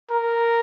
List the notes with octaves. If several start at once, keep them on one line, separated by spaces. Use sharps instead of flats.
A#4